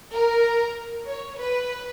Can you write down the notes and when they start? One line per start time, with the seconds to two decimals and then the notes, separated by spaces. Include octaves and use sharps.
0.13 A#4
1.06 C#5
1.38 B4